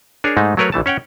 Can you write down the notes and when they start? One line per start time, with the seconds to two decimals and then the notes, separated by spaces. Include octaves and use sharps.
0.24 D4 G#4 A#4 C#5
0.37 G#2 G#3 A3 D#4
0.57 F#3 A3 A#4 B4 C#5
0.72 B1 E3 A3 A5
0.86 C#4 C#5 F#5 G5